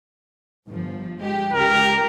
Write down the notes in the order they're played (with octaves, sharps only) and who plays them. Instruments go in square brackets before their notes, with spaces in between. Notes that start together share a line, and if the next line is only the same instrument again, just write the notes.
[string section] G1 F3
G#3 G4
[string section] C#2 G4 [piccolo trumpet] A#4